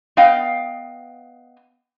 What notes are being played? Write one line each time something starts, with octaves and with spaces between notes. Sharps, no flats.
B3 D#5 F5 G5